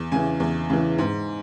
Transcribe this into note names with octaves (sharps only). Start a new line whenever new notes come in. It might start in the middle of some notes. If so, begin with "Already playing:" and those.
Already playing: E2
C#3 E3 G#5
E2
C#3 E3
G#2